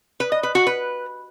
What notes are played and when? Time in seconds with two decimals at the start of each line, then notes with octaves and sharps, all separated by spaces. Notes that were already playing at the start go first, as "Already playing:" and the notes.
0.20 B4
0.32 D#5
0.43 B4
0.55 F#4
0.67 B4